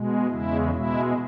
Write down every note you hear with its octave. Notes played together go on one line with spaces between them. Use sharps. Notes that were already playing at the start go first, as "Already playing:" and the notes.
Already playing: B2 G#3
E2 C#3 G#3 E4
B2 G#3 E4